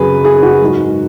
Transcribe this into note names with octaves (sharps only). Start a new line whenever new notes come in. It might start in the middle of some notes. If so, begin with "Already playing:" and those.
Already playing: F#2 C#3 F#3 G#4 B4
G#4
F#4
G#2 F#3